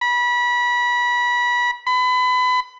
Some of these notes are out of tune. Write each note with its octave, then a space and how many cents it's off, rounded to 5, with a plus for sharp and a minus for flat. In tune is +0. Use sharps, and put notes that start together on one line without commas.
B5 -25
B5 +30